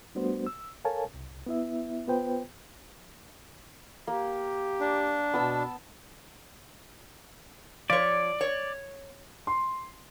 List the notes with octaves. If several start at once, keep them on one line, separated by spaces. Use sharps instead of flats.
G3 A3 B3 D4 F#4 C5
E6
A4 A#4 C#5 F5 G#5 A5
C2
B3 E4 E5
B3 F4 B4 C5 G5
A#3 G4
D4
B2 B3 A5 E6
F3 C#5 D5
C#5
C6